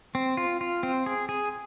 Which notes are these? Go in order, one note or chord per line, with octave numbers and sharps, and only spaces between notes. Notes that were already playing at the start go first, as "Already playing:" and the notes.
C4
F4
F4
C4
G#4
G#4